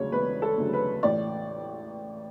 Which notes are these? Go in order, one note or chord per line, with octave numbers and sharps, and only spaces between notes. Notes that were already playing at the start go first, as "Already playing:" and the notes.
Already playing: E1 D2 C#3 F#3 C#5
E1 B4
A4
D2 C#3 F#3
B4
A1 D5